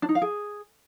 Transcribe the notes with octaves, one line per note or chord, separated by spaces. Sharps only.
D4
D#4
F5
G#4